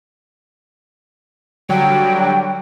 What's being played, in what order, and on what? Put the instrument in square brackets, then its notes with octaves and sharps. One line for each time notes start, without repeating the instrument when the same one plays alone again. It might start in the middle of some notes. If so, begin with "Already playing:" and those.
[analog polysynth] D3 F#3 G3 [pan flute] G5